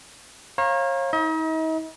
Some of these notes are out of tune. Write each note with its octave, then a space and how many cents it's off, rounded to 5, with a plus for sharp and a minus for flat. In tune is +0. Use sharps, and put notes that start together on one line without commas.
C#5 -35 F5 +0 A#5 +20
D#4 +40 D#5 +45